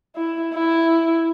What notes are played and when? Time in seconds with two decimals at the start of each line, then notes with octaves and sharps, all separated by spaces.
0.16 E4
0.54 E4